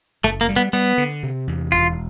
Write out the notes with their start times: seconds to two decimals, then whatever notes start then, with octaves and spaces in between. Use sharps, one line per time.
0.24 F#1 A3
0.41 A#3
0.49 G3
0.56 B3
0.73 G3 B3
0.98 D3
1.23 C3
1.47 E2
1.72 E1 F4